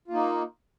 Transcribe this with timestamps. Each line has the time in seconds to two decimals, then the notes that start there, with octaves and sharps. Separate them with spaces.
0.08 F4
0.11 A#3
0.14 D#4